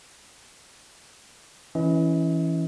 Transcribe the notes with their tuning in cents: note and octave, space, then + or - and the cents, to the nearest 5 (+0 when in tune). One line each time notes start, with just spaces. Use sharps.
E3 +0 C#4 +0 D#5 +45